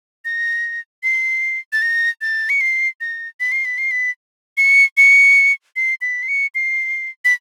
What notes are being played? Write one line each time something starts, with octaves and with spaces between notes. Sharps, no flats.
A#6
C7
A6
A#6
A6
C#7
C7
A#6
B6
C7
B6
C7
B6
C#7
C#7
C7
B6
C7
C#7
C7
B6